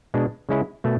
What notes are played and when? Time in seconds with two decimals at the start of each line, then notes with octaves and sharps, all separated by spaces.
0.14 B2 G#3 D4
0.49 C#3 G#3 C#4 E4
0.84 B2 A3